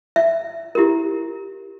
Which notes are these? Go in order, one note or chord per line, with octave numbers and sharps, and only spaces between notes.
E5
E4 G4 A#4